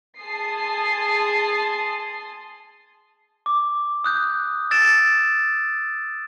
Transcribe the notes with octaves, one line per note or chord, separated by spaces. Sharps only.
G#4 A5 C6 D#6 C7
D6
D#6 F#6 G6
E6 A6 D7 E7